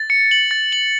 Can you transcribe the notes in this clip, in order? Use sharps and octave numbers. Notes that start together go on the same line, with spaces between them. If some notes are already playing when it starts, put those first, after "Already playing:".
Already playing: A6
C#7
F#7
A6
F#7